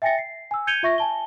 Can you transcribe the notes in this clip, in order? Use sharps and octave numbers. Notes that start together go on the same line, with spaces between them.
E5 G5 G#5 A6 A#6 C#7
C7
G#5 E6
G6 G#6 C#7 D#7 F7 G7
F4 E5 C#6 A#6
G#5 A5 G7